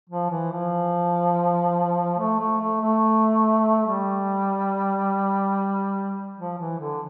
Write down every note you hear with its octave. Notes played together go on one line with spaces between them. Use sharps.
F3
E3
F3
A3
A3
A3
A3
G3
F3
E3
D3